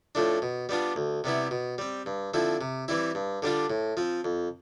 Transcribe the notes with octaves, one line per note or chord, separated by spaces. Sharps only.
A2 F3 A3 D4
B2
G3 B3 D4 F4
D2
C3 G3 B3 E4
B2
G3 C4
G2
D3 F3 C4 E4
C3
E3 G3 C4 E4
G2
D3 G3 D4 F4
A2
F3 C4
F2